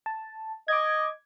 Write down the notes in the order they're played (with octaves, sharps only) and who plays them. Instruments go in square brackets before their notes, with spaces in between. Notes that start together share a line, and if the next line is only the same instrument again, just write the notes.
[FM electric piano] A5
[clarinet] D#5 [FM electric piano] D6 G#6